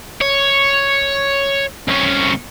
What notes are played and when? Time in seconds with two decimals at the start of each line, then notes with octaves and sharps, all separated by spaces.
0.21 C#5
1.88 C2 C#4